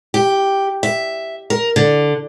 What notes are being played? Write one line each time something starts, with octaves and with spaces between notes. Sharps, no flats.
G4
E5
A#4
D3